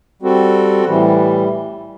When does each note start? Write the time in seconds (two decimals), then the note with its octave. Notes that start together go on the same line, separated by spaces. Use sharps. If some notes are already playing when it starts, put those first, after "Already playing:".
0.22 G3 C4 F#4 A4
0.85 A2 E3 G3